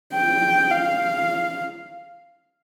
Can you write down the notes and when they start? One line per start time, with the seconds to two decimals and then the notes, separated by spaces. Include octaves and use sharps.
0.14 G5
0.71 F5